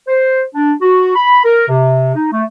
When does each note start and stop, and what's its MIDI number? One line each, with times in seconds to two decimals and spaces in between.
0.08 0.42 72
0.55 0.72 62
0.81 1.14 66
1.15 1.41 83
1.44 1.68 70
1.69 2.13 48
2.15 2.32 63
2.32 2.43 57